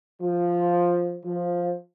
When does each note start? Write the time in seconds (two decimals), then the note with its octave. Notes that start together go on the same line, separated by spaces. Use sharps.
0.22 F3
1.25 F3